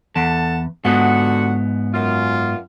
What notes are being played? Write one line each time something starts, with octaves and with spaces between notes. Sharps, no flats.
E2 A4 F#5 A5
G#2 D3 B3 F#4 F#5
F#2 F4